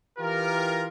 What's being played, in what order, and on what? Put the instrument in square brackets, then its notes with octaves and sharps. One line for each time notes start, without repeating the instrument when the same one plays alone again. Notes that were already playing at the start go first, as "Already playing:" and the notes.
[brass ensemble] E3 F4 G4 A#4